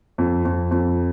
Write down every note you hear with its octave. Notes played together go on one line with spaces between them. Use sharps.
F2
F2
F2